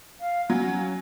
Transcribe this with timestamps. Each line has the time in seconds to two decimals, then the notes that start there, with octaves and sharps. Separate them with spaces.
0.21 F5
0.50 F#3 C#4